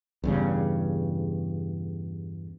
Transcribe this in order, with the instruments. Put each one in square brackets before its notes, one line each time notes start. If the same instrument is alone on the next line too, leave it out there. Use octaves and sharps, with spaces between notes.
[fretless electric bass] E2 G2 C#3